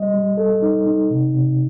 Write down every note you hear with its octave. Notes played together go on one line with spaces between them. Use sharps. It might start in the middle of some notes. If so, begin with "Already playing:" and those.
Already playing: G3 D#5
G3
A4
D#4
D#4
C3
C3